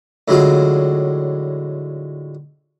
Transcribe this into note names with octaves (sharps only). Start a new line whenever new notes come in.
A2 D3 F#3 G#3 F4